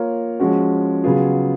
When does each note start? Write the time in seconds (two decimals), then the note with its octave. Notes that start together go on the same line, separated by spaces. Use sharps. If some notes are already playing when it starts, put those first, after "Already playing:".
Already playing: A#3 F4 A#4 C#5
0.40 F3 G#3 C#4 F#4
1.04 C#3 F#3 B3 F4 G#4